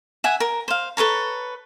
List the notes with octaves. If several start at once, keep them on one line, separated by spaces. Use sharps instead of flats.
E5 F#5 G#5
A#4
C5 F5
A4 B4 C#5 A#5